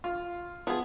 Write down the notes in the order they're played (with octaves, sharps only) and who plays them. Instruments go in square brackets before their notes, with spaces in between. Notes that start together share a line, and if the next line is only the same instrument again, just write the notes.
[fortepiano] F4
[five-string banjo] F3 G#4 [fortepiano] B3